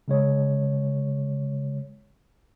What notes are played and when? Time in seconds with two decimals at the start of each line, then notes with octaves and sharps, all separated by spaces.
0.08 C#3 G#3 C#5